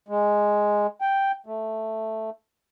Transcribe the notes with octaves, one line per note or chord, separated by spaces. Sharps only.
G#3
G5
A3